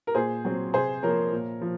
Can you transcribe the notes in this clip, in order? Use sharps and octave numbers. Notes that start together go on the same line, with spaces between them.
A#4
A#2 G#4 C5
F#3 C4
C3 G#4 C5
F3 A#3 A#4 C#5
A#2
F3